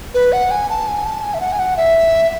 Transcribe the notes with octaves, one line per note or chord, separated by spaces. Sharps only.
B4
F#5
G#5
A5
G#5
A5
G#5
E5
F#5
G#5
F#5
E5